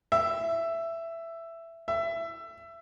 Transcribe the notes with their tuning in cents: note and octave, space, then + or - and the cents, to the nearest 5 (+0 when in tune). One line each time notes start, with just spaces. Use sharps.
E5 +10
E5 +20